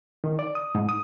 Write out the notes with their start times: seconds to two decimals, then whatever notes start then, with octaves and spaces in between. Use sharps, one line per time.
0.24 D#3
0.39 D5
0.55 D#6
0.75 G#2
0.89 D#6